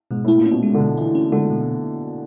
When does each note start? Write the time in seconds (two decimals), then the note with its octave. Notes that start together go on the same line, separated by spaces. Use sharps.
0.11 G#2 B2
0.25 A2 E4
0.38 A#2
0.46 C#4
0.51 B2
0.63 G#3
0.74 D3
0.80 B2
0.97 E3 E4
1.15 C#4
1.32 D3 G#3
1.50 B2